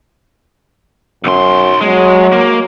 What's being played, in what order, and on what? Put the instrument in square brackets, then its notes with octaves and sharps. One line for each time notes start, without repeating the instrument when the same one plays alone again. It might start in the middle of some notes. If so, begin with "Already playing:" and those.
[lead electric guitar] B1 C6 [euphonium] F#2
[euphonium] F#3 [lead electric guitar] G#3
[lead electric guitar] A#3